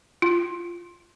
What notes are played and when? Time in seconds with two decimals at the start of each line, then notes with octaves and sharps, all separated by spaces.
0.22 F4